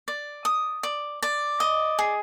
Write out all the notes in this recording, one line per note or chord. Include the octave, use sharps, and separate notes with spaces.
D5
D#6
D5
D5
D#5
G#4